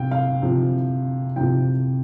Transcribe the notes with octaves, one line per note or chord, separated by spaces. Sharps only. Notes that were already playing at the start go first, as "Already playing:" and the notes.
Already playing: C3 F5 G5
F5
C3 F3
C3 F3 G5